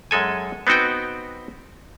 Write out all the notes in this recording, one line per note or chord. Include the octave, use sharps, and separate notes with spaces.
F#2 G#3 A4 G#5
B3 C4 D#4 F#4 G5